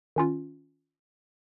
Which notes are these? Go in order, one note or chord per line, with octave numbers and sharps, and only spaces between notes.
D#3 C#4 F4